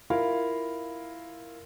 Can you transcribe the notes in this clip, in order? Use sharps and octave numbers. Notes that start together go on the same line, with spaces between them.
E4 F4 A#4 F5